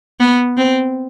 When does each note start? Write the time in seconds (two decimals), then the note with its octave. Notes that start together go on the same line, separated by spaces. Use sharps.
0.20 B3
0.57 C4